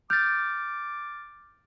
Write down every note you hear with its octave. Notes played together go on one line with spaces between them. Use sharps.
D6 F6 G6 A6